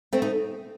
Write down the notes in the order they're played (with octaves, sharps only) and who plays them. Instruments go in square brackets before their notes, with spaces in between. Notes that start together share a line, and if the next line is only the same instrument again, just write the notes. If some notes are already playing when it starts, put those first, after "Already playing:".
[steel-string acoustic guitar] A3 C4
D#4